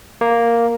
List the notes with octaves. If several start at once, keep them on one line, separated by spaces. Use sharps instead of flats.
A#3